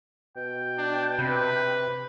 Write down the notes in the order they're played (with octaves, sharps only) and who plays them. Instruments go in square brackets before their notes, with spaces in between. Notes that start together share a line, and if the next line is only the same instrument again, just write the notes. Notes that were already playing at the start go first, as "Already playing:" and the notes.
[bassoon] B2 [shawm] G5
[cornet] D4
[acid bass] C3 [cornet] B4